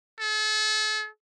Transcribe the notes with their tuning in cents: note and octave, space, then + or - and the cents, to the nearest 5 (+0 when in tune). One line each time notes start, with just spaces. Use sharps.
A4 -40